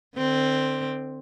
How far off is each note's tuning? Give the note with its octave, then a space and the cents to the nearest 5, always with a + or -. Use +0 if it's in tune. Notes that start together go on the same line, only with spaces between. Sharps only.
D3 +35 C4 +0